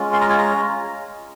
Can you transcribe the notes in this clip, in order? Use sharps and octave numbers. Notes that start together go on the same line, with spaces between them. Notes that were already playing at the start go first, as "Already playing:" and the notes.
Already playing: G#3 C#4 F4
C6
A#5
G#5
A#5